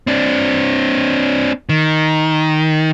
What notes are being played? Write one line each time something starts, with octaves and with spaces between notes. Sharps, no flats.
C4 D4
D#3